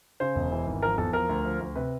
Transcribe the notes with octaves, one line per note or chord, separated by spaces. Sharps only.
C#3 C5
E1
E3
G#1
F3 A#4
E2 A4
F3 A#4
D2
F3
D2
C3 B4